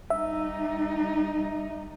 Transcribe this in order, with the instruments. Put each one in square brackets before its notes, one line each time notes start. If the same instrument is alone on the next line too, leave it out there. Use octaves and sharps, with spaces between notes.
[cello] G3 D#4 [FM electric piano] E5